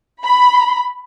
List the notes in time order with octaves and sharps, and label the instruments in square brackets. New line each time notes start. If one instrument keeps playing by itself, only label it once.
[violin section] B5